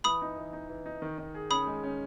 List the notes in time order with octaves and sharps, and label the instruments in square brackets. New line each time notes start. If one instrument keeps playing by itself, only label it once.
[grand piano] E3 [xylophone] B5 D#6
[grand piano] D#4
E3
D#4
E3
D#4
D#3
D#3
G#4
[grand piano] C#4 [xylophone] B5 D#6
[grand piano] G#3
C#4